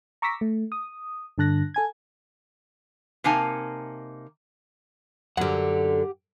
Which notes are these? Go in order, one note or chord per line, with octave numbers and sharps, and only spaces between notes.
A#5 C#6 D6 E6 A#6 B6
A3
D#6
G2 D3 A5 F#6 A#6
A4 G#5 G#6
C3 A#3 D#4 G#5 A5
F#2 D3 G4 F#5